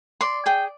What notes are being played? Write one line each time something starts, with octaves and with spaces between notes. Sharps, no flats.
D5 C6
G#4 G5